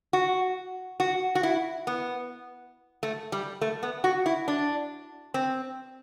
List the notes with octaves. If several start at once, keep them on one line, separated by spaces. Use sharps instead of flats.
F#4
F#4
F#4
E4
B3
A3
G3
A3
B3
F#4
E4
D4
C4